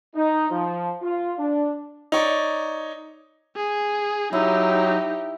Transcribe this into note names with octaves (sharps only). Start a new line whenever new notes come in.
D#4
F3
F4
D4
D#4 C#5 D5
G#4
F#3 D#4 E4 G4